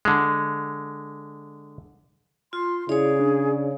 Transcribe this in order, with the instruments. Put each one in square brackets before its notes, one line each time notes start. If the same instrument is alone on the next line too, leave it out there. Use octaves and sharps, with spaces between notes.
[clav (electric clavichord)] D3 G#3
[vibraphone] F4 [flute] C6
[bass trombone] C#3 [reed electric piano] E4 [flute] G#4 [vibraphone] C#5 D5
[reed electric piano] D4